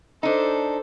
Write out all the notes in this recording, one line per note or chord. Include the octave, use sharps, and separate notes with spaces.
D4 D#4 A4 C5